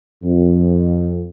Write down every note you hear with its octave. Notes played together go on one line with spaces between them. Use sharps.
F2